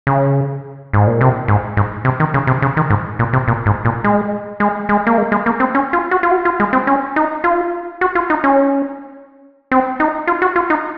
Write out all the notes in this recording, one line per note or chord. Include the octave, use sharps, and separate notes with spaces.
C#3
G#2
A#2
C3
G#2
G#2
C3
D#3
C#3
C3
C#3
D#3
G#2
A#2
C3
A#2
G#2
A#2
G#3
G#3
G#3
A#3
G#3
G#3
A#3
C4
C#4
F4
F#4
F4
F#4
F4
G#3
C4
C#4
D#4
F4
F#4
F4
D#4
C#4
C4
D#4
F4
F#4
F4
D#4